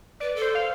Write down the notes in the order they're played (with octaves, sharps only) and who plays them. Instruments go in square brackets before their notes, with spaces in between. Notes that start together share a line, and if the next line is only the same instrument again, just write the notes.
[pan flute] B4 [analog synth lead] D5
[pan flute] A4
[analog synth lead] C5
F5